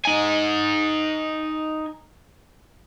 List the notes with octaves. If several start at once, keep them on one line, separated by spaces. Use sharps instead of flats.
D#4 G#5